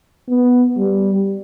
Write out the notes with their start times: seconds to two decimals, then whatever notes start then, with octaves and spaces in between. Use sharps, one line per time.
0.28 B3
0.77 G3